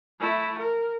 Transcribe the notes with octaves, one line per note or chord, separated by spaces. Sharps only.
A3 E4
A#4